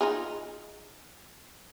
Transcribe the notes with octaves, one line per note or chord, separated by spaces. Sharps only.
D#4 F4 G#4